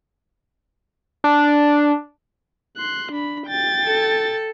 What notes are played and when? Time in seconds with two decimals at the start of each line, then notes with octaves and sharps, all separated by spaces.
1.24 D4
2.77 C6 F#6
3.12 D4 B5
3.47 G5 A6
3.84 A4